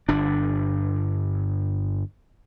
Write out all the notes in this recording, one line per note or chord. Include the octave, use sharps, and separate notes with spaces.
G1 D4